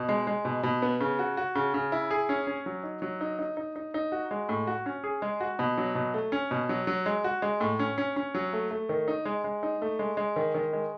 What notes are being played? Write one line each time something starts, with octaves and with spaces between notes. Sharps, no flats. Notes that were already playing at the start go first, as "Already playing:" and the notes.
Already playing: B2
G#3
G#3
B2
B2
B3
C#3
F#4
F#4
C#3
C#3
E4
G#4
C#4
C#4
F#3
D#4
F#3
D#4
D#4
D#4
D#4
D#4
F#4
G#3
A2
F#4
C#4
G#4
G#3
F#4
B2
F#3
B2
A3
C#4
B2
F#3
F#3
G#3
F#4
G#3
A2
C#4
C#4
C#4
F#3
A3
A3
D#3
D#4
G#3
G#3
D#4
A3
G#3
G#3
D#3
D#3
G#3